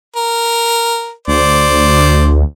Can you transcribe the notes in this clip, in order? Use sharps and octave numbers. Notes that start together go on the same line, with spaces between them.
A#4
D2 C5 D5